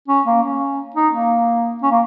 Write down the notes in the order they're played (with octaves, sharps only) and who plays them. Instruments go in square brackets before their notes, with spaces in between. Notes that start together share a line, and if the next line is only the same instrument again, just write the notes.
[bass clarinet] C#4
A#3
C#4
D#4
A#3
C#4
A#3